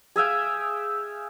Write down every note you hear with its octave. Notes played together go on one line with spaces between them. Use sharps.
G#4 E5 F5 G5